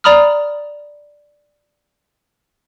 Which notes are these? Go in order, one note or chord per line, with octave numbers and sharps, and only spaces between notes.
D5 A#5 B5 D#6 F6